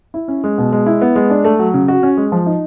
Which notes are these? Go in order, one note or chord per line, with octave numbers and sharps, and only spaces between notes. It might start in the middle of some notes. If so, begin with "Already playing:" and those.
E4
C#4
G#3
B2
G#3
E4
B3
G#3
D4
A3
F#3
C#3
F#4
C#4
G#3
F3
D#4